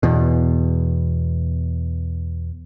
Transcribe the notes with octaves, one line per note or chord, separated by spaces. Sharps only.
E2 B2